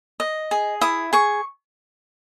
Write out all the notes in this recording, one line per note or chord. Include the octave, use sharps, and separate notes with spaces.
D#5
G#4
E4 D#6
G#4 C#6